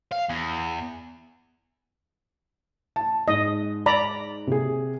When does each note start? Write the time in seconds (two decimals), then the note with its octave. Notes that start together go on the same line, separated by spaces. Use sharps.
0.12 F5
0.30 E2
2.96 A5
3.28 G#2 D#5
3.86 D5 A#5 B5
4.47 C3 G#4